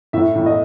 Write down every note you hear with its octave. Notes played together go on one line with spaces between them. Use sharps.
A2 E5
A2
D#5